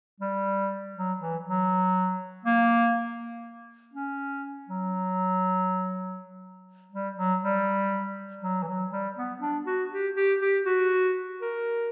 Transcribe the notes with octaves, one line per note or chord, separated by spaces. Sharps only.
G3
F#3
E3
F#3
A#3
C#4
F#3
G3
F#3
G3
F#3
E3
F#3
G3
B3
D4
F#4
G4
G4
G4
F#4
A#4